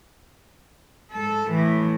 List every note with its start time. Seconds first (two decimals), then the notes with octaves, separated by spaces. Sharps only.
1.12 G#2 A4
1.49 A2 E3